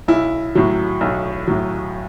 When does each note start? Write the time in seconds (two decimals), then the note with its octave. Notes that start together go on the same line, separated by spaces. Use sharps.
0.08 B1 E4
0.55 A2 F#3
1.01 B1
1.47 A2 F#3